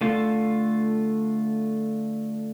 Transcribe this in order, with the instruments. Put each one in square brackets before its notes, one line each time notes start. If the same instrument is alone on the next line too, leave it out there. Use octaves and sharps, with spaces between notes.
[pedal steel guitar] D3 A3 F4